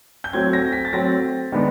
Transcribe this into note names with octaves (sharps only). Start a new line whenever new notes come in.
G6
F#3 A3 C4 G#6
A#6
B6
A6
F#3 A3 C4 A#6
D#3 G#3 B3 D4